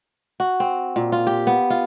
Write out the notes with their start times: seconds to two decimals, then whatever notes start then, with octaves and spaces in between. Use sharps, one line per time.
0.40 F#4
0.60 C4
0.96 A#2
1.12 F4
1.27 G4
1.47 B3
1.70 F4